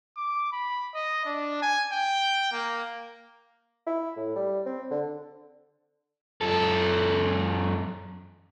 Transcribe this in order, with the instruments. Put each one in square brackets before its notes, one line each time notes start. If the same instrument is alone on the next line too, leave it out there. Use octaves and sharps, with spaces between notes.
[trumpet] D6
B5
D#5
D4
G#5
G5
A#3
[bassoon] E4
A2
G3
C4
D3
[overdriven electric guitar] F#2 A4